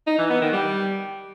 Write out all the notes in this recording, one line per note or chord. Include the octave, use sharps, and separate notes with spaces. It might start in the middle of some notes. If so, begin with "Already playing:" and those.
D#4
E3
B3
D#3
G3